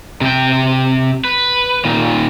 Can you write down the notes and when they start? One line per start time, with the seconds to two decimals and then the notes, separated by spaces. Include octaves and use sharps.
0.21 C3 G5
1.25 B4
1.85 A#2 D#3